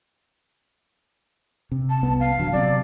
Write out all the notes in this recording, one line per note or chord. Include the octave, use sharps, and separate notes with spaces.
C3
A5
C2 B3
F5
D#1 D3 F#3
C3 F#3 D5